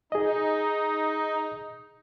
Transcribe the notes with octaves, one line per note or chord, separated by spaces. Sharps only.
D#4 G#4 D#5